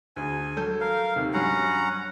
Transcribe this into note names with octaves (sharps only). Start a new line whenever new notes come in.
D2 G#4 G#5
F#3 A4 G6
A#4 F5
D#2 C3
G2 F#3 C#4 F#5 A#5 C7